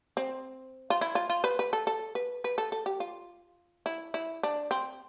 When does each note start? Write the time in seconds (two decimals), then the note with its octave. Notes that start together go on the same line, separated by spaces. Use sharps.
0.17 C4
0.90 F4
1.01 E4
1.15 F4
1.30 F4
1.44 B4
1.59 B4
1.73 A4
1.87 A4
2.15 B4
2.44 B4
2.58 A4
2.72 A4
2.86 G4
3.00 F4
3.86 E4
4.14 E4
4.43 D4
4.71 C4